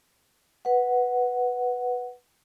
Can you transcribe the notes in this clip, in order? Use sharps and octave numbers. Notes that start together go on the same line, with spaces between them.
B4 F#5